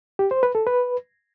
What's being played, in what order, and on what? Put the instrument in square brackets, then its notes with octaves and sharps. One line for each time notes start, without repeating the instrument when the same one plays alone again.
[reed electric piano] G4
C5
B4
A4
B4